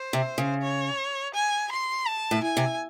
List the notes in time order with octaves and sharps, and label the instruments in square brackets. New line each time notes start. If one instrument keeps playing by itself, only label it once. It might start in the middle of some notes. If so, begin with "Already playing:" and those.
Already playing: [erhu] C5
[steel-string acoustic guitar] C3
C#3
[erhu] C#5
G#5
C6
A5
[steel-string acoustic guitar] A2
[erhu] G#5
[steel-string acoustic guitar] C3